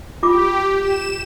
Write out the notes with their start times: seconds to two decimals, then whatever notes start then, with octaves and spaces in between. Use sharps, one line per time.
0.23 F4 G4 D6
0.81 E7